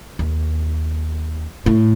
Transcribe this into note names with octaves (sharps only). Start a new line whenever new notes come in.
D#2
A2